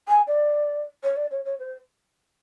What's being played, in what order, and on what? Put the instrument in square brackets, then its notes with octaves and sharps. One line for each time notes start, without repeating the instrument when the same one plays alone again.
[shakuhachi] G#5
D5
C#5
D5
C#5
C#5
C5